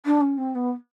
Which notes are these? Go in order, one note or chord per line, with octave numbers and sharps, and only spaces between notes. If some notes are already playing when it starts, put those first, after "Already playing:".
D4
C#4
C4
B3